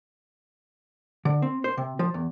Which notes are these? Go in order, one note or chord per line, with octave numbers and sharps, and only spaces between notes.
D3
C4
C5
C3
F3
E2